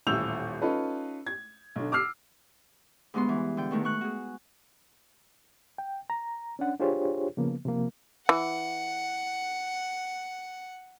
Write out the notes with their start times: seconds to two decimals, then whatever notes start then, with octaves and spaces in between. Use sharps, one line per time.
0.07 D#1 A1 E4 E6 G6 F7
0.62 C#4 D#4 F4 A4 B4
1.26 G#6
1.76 B1 D3
1.92 D6 E6 F6 C7
3.14 D2 G2 G#3 B3 C6
3.29 E3
3.57 D3 G5
3.71 B2 D#3 A3
3.84 A3 C#6 F#6
4.01 F#4 G#4
5.78 G5
6.10 A#5
6.59 C#4 D4 F#5
6.80 D4 F4 G4 G#4 C5 C#5
7.37 C#3 F3 A#3 B3
7.65 C3 F3 A#3
8.29 E3 F#5